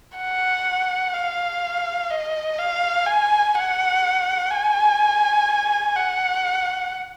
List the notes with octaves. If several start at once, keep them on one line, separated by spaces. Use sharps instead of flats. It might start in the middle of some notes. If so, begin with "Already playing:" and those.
F#5
F5
D#5
F5
G#5
F#5
G#5
F#5